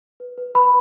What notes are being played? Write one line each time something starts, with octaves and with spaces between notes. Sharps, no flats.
B4
B4
B4 B5